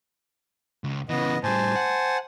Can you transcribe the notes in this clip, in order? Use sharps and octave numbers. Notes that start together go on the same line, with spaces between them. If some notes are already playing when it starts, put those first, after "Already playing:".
C#2
C#3 E3 B3 D#5
A2 G3 C5 G#5 A5
F#5